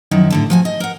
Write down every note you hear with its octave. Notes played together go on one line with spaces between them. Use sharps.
F#2 D#3 F3 E4
A2 D3 A4
F3 F#4 G#5
D#5
A#4 F#5